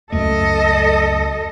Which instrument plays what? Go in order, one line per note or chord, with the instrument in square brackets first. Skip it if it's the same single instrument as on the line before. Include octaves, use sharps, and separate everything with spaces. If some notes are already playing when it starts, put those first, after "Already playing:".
[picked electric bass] C#2 F#2 A3 [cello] A4 D#5